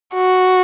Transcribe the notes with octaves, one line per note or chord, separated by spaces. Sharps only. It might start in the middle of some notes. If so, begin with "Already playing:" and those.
F#4